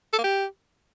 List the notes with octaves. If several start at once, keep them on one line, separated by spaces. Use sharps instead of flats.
A4
A#3
G4